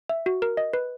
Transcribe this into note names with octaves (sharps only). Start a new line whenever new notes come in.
E5
F#4
A#4
D#5
B4